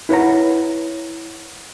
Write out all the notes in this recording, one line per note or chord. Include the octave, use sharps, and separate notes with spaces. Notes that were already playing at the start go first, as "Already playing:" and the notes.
E4 B4 C#5 F#5 A#5